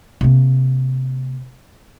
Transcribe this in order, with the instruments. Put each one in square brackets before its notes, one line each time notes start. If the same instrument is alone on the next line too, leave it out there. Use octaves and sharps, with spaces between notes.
[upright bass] C3 A#3